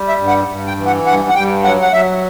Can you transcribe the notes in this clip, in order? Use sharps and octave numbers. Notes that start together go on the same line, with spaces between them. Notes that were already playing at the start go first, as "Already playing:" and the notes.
Already playing: G3
E5
G2
F#5
G2
G5
E3
F#5
G2 F#5
F#5
G2 G5
F#3 F#5
F#5
F#3 E5